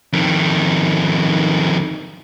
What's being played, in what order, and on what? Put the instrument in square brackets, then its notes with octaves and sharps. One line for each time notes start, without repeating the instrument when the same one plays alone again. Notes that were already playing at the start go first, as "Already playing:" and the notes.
[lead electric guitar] F2 D#3